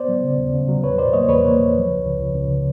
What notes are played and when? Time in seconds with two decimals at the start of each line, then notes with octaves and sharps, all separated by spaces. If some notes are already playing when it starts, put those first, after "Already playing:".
Already playing: B3 C5 D5
0.09 F#3
0.23 C#3
0.38 D#2
0.54 C#3
0.68 F#3
0.83 E2 B4 C#5
0.98 F#3 C5 D5
1.13 A#3 C#5 D#5
1.29 E2 B4 C#5
1.45 A#3
1.59 E2
1.75 F3
1.90 C#2
2.05 C#2
2.20 C#2
2.36 C#2
2.50 C#3